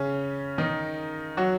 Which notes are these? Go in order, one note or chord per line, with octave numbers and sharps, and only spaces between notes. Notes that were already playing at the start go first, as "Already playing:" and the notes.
Already playing: C#3 C#4
D#3 D#4
F#3 F#4